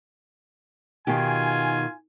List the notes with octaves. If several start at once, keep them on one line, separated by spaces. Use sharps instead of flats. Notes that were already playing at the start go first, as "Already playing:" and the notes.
B2 D#3 F4 G4 G#5